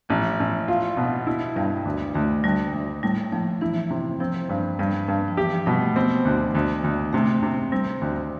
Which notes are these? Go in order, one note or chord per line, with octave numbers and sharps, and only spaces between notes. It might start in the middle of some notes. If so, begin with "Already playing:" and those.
A1 F3
A1
F4
B2
E4
G2 G3
D2
D2 A3
D2 G3
D2
A2 G3
A2 F3
E3 E4
C3
F3 C4
G2
G2 G3
G2
F3
E3 G4
F3
B2 G3
A3
B3 C4
D2
D2
D2
C3 A3
C3
G3 C4
D2